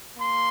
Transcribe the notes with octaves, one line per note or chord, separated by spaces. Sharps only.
A#3 C6